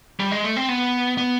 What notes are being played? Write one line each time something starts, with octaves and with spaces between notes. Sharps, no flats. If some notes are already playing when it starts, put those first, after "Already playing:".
G3
G#3
A3
C4
B3
B3